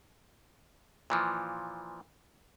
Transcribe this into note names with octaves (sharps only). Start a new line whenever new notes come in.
A#2 E3 F3